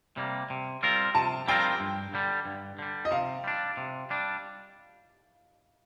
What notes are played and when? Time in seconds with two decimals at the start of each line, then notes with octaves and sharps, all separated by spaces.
0.17 C3 G3 A#3
0.50 C3
0.83 G3 C4 F4 A#4
1.15 C3 A5
1.48 G3 C4 F4 A#4 G5
1.80 G2
2.14 D3 G3
2.46 G2
2.79 D3 G3
3.05 D#5
3.11 C3 F5
3.44 G3 D4
3.77 C3
4.10 G3 D4